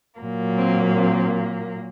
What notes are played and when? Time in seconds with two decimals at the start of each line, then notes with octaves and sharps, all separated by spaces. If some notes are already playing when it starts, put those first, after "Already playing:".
0.19 A#2 F#3 A#3
0.58 C4
0.96 C4